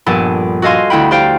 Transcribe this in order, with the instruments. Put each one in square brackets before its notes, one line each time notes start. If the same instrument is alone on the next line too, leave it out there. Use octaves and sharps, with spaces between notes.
[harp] A#1 G2 B3 A4 G#5
F#4 A4 D#5 F5 G#5 C6
D2 E4 F#5 G5 B5
G4 C5 D5 F5 G5